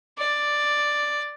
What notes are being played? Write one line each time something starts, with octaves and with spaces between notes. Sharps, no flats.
D5